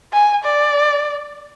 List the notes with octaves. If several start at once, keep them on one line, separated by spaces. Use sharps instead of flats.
G#5
D5